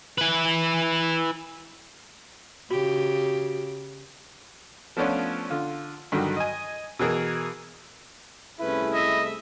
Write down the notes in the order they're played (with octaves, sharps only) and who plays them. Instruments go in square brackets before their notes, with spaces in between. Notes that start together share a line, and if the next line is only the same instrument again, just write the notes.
[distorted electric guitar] E4 B4
[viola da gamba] C#3 G4 [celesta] F#4
[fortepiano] F3 A3 B3 C#4 D4 F4
D3 F4
G2 D3 D#3 F#3
D#5 G#5
B2 E3 G#4 A#4
[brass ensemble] C2 A3 G#4 [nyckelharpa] C#4 B4 [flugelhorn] E4
[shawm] D#5 [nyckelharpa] E5